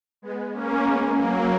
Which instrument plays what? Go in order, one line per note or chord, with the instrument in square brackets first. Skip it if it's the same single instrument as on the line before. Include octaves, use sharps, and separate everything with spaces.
[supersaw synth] G#3 B3
A#3 C#4
G#3 B3
F#3 A#3